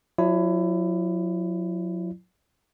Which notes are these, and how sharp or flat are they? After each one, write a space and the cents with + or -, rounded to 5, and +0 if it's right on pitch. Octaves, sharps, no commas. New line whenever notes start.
F#3 -35 E4 +20 D5 +0